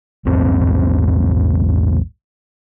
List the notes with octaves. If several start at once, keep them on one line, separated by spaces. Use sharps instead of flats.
A#1 E2 G#2 C4